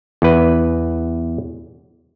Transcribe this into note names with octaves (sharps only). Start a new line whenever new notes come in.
E2 B4